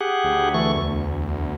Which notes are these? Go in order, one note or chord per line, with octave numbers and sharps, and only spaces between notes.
G4 G#4 F#5
D2
E3 A3 C#6
E2